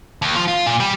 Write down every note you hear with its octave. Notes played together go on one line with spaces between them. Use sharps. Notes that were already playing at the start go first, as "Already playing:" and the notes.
D#2
F3
F4
A#2
G3